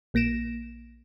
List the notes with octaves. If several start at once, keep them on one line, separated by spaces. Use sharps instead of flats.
A#1 A#3 A#6 D7 E7